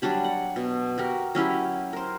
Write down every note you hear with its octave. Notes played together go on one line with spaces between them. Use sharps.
F#3 G3 D4 G4
F#5
B2
F#4 G4 A#4
F#3 C#4 E4 G4
A#4 C5